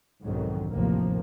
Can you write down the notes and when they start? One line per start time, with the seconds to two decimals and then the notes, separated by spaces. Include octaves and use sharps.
0.24 B1 F2 G#2 D3 D#3 F#3
0.73 A1 D#2 C3 F3 A#3